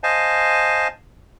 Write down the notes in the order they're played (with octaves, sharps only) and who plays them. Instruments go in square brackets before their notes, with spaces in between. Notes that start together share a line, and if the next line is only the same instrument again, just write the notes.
[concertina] C5 D#5 F5 G#5 A5